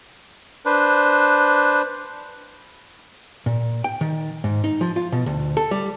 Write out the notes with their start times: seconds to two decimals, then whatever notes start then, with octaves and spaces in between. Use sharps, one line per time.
0.66 D4 B4 C5
3.46 A#2
3.84 G5
4.01 D#3
4.44 G#2
4.64 D#4
4.81 F3
4.96 F4
5.12 B2
5.26 D2
5.57 A4
5.71 G3